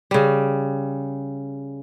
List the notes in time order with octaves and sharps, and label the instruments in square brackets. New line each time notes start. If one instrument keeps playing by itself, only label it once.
[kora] C#3 G3